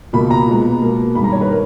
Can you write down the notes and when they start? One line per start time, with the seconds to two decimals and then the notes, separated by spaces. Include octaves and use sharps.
0.13 C#2 B2 A#3 B5
0.31 A#5
0.47 A#2 G#3 B3
0.81 B2 A#3
1.15 G2 D#3 G#3 B5
1.24 A#5
1.32 C#5
1.41 B4
1.50 A#4